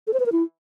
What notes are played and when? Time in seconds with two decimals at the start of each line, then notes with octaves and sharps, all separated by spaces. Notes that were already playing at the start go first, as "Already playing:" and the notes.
0.07 A4
0.13 C5
0.20 B4
0.26 A#4
0.32 E4